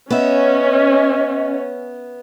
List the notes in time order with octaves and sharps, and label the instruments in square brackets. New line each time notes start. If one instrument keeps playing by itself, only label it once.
[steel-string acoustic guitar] B3 E5 [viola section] C#4 [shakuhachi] D#5